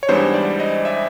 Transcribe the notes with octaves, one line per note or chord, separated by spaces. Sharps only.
C#5
G#2 E3 G3 B3 D4 C5
D5
D#5
E5